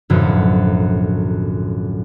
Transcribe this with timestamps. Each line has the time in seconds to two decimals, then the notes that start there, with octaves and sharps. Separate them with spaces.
0.10 B1 F#2 A2 D3 F3 F#3